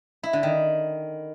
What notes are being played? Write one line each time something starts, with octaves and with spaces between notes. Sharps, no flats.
E4
D3
D#3